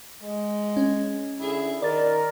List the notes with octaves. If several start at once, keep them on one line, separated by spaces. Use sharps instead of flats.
G#3
C#4
D3 E4 G#4
D#3 A#4 D5 A6